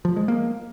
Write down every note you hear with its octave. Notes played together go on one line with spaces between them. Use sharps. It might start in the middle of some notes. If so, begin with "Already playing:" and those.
F3
G#3
A#3